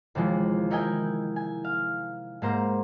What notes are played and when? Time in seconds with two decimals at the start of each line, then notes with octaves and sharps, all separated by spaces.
0.15 D#2 C3 E3 F3 G#3
0.71 D#4 E4 A#4 D#5 G5 G#5
1.36 G#5
1.64 F5
2.42 G#2 A#3 C5 A#5